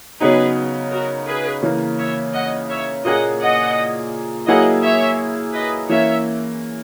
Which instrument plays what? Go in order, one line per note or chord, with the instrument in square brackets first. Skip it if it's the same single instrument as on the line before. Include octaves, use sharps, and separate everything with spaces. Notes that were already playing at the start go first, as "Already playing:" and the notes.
[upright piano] C#3 F#3 B3 D#4 [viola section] G#4 B4
[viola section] F#4 A#4
G#4 B4
[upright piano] C#3 E3 A#3
[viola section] C#5 E5
D#5 F#5
C#5 E5
[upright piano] A#2 A#3 C#4 G#4 [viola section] D#5 F#5
[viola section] D#5 F#5
[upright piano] F#3 A#3 E4 G#4 [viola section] D#5 F#5
[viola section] C#5 E5
B4 D#5
[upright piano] E3 A#3 C#4 [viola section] C#5 E5